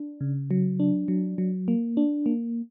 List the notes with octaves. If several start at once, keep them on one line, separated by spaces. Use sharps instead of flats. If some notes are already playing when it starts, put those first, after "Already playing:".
Already playing: D4
C#3
F#3
D4
F#3
F#3
A#3
D4
A#3